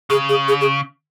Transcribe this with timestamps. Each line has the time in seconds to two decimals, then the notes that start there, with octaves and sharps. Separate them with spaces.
0.10 C#3 G#4
0.29 G#4
0.48 G#4
0.61 G#4